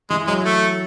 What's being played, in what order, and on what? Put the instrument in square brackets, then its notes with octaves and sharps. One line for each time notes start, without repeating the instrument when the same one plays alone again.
[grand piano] E3 [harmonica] G#3
[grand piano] F#3 [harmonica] G#3
[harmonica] A3